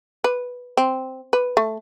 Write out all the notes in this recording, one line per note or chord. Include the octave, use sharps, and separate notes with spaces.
B4
C4
B4
A3